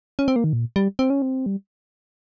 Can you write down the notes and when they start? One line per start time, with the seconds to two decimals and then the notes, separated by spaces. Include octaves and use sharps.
0.19 C#4
0.28 C4
0.36 A#3
0.44 D#3
0.53 A#2
0.76 G3
0.99 C4
1.10 C#4
1.22 C4
1.46 G3